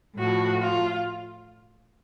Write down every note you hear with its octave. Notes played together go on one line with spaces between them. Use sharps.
A2 F3 F#4
F4